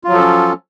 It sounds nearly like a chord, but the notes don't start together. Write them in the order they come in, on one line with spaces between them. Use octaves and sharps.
F4 F#3 F3 A4 C#4